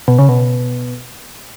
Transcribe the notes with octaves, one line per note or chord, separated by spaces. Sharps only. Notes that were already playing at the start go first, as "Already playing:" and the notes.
B2
C#3
B2